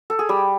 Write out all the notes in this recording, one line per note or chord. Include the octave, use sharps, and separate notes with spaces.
A4
G#4
G3 G4